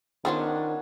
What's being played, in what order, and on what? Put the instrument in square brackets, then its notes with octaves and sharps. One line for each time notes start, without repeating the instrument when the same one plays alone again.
[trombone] D#3 [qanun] B3 C#4 D4 [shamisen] F4 C5 F#5